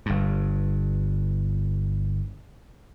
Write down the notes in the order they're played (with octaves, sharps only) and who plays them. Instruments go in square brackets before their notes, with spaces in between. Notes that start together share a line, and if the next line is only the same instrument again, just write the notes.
[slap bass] G1 G2